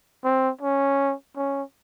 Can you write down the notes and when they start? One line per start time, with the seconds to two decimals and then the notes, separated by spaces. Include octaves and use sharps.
0.24 C4
0.61 C#4
1.36 C#4